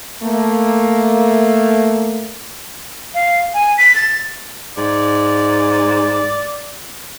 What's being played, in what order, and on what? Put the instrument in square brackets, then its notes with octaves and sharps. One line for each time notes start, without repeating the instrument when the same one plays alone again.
[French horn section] A3 A#3
[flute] F5
G#5
B6
A6
[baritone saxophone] G#2 [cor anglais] D5